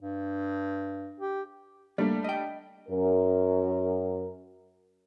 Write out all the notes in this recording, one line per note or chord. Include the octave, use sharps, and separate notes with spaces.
G2
G4
G3 A3 A#3 D4
D#5 G5
F#2 A#4